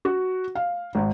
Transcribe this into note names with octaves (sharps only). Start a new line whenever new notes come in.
F#4
F5
G#1